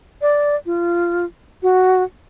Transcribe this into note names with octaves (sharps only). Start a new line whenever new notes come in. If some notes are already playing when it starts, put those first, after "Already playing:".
D5
F4
F#4